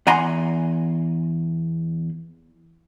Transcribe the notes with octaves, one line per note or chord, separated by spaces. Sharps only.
E2 F#5 G#5 A#5 C6